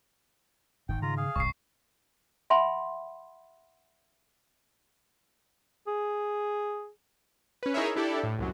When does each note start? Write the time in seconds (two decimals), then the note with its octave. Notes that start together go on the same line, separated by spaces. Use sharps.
0.89 F#1 G#2 D#3 G5
1.02 C#3 F4 A#5
1.17 G#4 F5
1.36 D#1 C2 G2 C#6 C7
2.50 E5 F#5 G#5 B5 C6
5.87 G#4
7.63 C#4 B4
7.74 D#4 E4 G#4 A#4 C#5 E5
7.96 D4 E4 G4 A4 D5
8.23 A2
8.39 C2 F#2 F#3